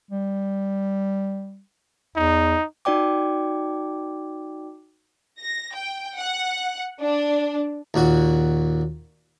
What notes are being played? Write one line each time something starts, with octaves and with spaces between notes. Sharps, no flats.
G3
E2 D#4
D#4 F#4 D5 G5 D6
A#6
G5
F#5
D4
D#2 A#2 F#4